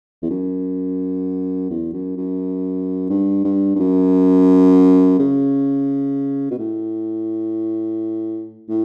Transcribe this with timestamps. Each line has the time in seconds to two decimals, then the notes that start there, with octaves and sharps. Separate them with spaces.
0.22 E2
0.30 F#2
1.70 E2
1.93 F#2
2.17 F#2
3.10 G2
3.44 G2
3.75 G2
3.79 F#2
5.19 C#3
6.51 B2
6.58 A2
8.69 A2